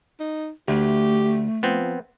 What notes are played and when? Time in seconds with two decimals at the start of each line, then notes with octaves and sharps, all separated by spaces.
0.20 D#4
0.68 D2 A3 G4
1.63 F3 B3 C4